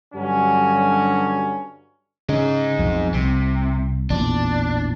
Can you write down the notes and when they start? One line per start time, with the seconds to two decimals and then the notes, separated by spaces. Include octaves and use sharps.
0.14 G2 D3 F#3 C#4
2.29 C#3 G#3 D#4
2.79 B1 F2
3.14 C2 C3
4.10 A1 E2 A#2 D4